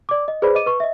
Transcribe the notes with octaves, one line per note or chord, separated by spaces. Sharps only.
D5 D6
D#5
G#4 B4 C5 D5 B5
D#5 D6 D#7
B4 C#6
D#5 E5